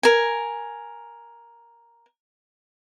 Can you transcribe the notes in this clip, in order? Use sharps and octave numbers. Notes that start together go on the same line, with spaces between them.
A#4 G#5